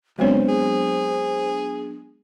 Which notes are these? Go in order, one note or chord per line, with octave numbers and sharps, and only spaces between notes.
C#2 F#3 G#3 B3 C4 D4 C5 C#5
G#4